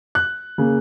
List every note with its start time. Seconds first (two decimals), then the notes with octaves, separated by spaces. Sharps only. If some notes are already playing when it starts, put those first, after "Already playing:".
0.15 F#6
0.58 C#3 A#3